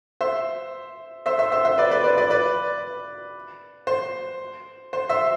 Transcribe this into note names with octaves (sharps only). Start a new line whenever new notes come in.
C5 E5
C5 E5
C5 E5
C5 E5
C5 E5
B4 D5
B4 D5
B4 D5
B4 D5
B4 D5
C5
C5
C5 E5